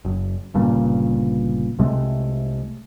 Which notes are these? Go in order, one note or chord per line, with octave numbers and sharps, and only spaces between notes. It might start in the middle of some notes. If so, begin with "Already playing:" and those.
F#1
G1 G2 A#2 C#3
C2 C3 G#3 A3